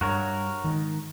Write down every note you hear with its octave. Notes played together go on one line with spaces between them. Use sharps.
G2 F#4 A#4 C#5
G#2 D#3